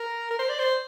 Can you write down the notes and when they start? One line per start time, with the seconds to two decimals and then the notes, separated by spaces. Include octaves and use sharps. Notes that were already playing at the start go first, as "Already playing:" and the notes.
Already playing: A#4
0.30 A#4
0.39 C5
0.49 D5
0.59 C5